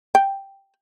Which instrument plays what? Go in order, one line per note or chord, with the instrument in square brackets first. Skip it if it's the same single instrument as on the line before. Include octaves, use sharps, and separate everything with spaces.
[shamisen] G5